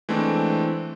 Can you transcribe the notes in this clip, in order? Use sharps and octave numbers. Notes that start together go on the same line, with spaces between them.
E3 G#3 A3 C4 D4